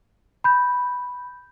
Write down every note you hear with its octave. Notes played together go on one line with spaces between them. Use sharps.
B5 G6